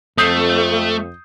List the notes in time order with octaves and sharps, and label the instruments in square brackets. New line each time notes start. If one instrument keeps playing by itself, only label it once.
[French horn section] F2 [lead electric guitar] A3 [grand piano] D#6 G6 C7